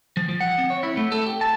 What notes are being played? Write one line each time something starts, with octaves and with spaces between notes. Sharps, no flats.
F3
F3
F#5
C4
C#5
E4
A3
A4
G4
A5